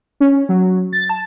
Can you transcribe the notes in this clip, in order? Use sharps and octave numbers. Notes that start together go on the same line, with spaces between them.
C#4
F#3
A6
A5